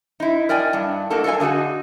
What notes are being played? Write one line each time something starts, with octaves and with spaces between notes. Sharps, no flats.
D#4 E4
A#4 D5 D#5 G5 G#5
G2 D4
A2 A#3 D#4 F#4 A4
A4 A#4 C#5 F5 G#5
D3 D#4 F4 F#4 G#4